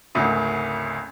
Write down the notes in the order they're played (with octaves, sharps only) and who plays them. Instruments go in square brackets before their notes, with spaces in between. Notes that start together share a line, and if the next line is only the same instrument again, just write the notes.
[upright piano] G#1 D2 C#3